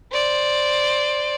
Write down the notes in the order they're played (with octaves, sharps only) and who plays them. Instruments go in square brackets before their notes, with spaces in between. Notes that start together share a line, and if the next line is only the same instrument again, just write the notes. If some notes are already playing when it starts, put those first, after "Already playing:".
[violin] C5 D5